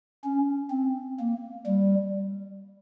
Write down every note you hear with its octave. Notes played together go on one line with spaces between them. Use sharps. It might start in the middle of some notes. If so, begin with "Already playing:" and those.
C#4
C4
A#3
G3